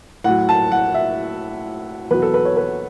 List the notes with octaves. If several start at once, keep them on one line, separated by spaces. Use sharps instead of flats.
A2 F#3 F#5
A5
F#5
E5
E2 B2 F#3 B4
A4
B4
C#5
B4